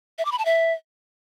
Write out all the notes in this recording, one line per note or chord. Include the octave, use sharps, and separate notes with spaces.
E5
D6
B5
A5
E5